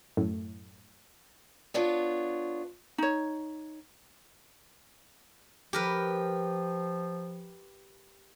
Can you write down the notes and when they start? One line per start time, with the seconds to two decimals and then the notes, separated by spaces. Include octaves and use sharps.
0.17 F#2 A2
1.74 B3 D4 F4 C#5
2.98 D#4 C#5
5.73 F3 G4 A#4 B4